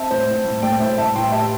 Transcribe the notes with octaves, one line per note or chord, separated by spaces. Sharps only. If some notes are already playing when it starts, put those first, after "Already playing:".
Already playing: C4 E5 A5
A2 C5
A2
A2
A3 D5 G5
A2 C5 E5
A2 E5 A5
A2 G5 C6
G3 E5 A5